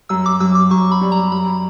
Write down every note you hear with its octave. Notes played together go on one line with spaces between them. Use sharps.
F#2 E6
D6
F#2 E6
D6
F#2 C#6
B5
G3
A#5
F#2 B5